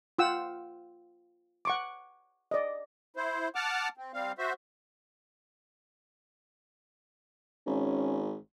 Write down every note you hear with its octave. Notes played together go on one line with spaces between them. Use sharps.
F4 F#5 G5 E6
F#5 C#6 D6
D5 D#5
E4 C5
F#5 A5 D6 F6
C4
G3 C4 F5
F#4 C5 E5
G#1 C#4